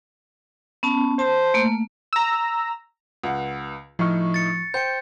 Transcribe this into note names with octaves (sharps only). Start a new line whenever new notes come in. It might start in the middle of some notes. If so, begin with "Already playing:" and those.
B3 C#4 A5
C5 A5
A3 A#3
A#5 E6
C#2 F#5
A2 F3 D#4 C#6 F6
A6 C#7
C5 G5 G6 C#7